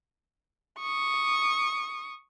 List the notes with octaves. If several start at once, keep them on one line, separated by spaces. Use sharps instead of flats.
C#6 D#6